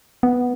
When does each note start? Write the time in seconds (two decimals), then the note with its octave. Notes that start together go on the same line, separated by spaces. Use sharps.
0.23 B3